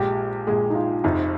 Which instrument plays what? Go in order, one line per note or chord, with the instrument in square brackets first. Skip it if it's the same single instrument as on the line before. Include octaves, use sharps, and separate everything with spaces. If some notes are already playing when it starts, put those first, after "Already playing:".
Already playing: [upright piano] A#1 A#2 G#3 [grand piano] G4
[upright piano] A#1 A#2 G#3 [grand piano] G#4
[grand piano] D#4
F4
[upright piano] F1 F2 C3 [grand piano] D#4